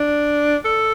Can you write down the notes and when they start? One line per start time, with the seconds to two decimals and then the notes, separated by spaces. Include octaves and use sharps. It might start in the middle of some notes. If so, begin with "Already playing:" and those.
Already playing: D4
0.65 A4